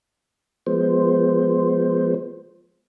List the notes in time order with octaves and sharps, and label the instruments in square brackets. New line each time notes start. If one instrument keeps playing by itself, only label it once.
[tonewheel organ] F3 G#3 B3 C5